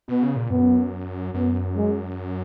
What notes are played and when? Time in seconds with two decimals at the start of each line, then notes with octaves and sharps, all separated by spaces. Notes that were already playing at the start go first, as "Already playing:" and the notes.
0.08 B2 B3
0.22 C#3
0.36 A#2
0.50 F#2 B3
1.34 F#2 B3
1.77 G#3